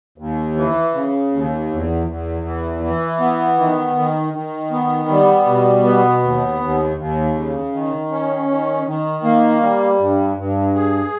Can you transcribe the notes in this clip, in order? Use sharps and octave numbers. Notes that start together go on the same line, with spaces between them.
D#2
E3
C#3
D#2
E2
E2
E3
E3
B3
D#3
D#3
D#3
B3
G3
B2
B3
D#2
D#2
D#2
C#3
D#3
C#4
D#3
D#3
A#3
G3
G2
G2
G#4